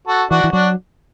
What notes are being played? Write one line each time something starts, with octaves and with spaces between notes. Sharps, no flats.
F#4 A4
E3 D4 F#4
E3
F#3 D4 F#4